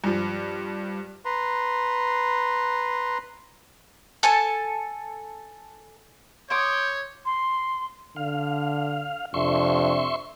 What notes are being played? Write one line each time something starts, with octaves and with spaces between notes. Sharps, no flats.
G2 F3
B4 A#5 C6
A4 G#5 A5
C#5 C6 D6 D#6 G6
C6
D3 F5
F2 C3 D4 E5 C6 C#6